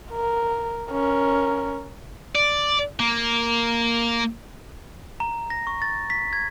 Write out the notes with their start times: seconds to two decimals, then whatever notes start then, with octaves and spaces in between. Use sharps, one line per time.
0.11 A#4
0.91 C#4 A#4
2.35 D5
2.99 A#3
5.20 A#5
5.50 A#6
5.67 C#6
5.82 A6
6.10 B6
6.33 G#6